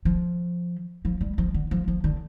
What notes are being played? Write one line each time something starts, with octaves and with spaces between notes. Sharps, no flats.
F3
F3
G3
F3
D3
F3
F3
D3